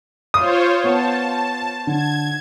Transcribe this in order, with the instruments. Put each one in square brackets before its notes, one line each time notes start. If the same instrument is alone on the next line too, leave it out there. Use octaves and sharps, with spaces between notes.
[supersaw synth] F4 C5 C#5 [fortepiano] D#6
[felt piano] B3 [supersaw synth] A5
[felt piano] D3 [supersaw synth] G#6